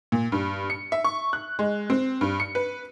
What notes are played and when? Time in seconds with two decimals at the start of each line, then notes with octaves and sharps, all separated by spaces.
0.12 A#2
0.32 G2
0.70 C#7
0.92 E5
1.04 C#6
1.33 F#6
1.59 G#3
1.90 C4
2.21 G2
2.40 C#7
2.55 B4